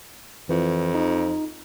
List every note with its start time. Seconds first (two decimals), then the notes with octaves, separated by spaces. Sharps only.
0.49 F2 E3
0.95 D#4